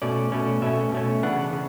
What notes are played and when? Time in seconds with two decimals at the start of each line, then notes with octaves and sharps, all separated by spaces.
0.02 B2 A3 C#4 D5
0.32 B2 A3 C#4
0.62 B2 A3 C#4 E5
0.92 B2 A3 C#4
1.23 C#3 E3 B3 D4 F#5
1.53 C#3